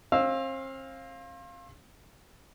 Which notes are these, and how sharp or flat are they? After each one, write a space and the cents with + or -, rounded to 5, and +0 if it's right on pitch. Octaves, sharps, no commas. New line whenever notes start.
C4 +40 F5 +0 E6 -5